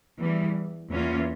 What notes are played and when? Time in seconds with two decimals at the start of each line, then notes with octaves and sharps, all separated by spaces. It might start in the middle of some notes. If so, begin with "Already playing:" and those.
0.19 E2 E3 G3
0.90 E2 E3 A#3 C#4 F4